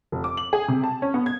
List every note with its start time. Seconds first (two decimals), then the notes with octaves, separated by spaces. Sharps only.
0.12 F1
0.24 D6
0.37 F#7
0.53 G#4
0.68 C3
0.84 A5
1.02 C#4
1.14 B3
1.26 G#6